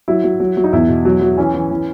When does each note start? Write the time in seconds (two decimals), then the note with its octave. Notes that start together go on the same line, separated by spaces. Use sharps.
0.08 F#3 E4
0.24 F#3
0.40 F#3
0.57 F#3
0.64 D#4
0.73 E2 E4
0.89 B2
1.05 F#3
1.21 F#3
1.37 E3 C#4
1.54 E3
1.71 E3